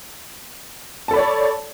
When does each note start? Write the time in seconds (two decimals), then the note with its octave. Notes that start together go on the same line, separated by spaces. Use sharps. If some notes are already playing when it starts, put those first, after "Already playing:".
1.08 A5
1.11 A4
1.13 B5
1.16 D5
1.19 C#5